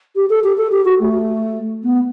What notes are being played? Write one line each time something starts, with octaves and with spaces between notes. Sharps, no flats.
G4
A4
G4
A4
G4
F#4
A3
B3